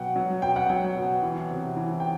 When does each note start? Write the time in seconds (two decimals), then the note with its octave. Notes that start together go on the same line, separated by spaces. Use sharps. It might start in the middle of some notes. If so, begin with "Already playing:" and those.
Already playing: B2 F#3 F#5 G5
0.16 F#3
0.42 B2 G5
0.56 F#5
0.69 F#3 G5
0.97 B2
1.23 E3
1.50 C3
1.77 E3
2.00 G5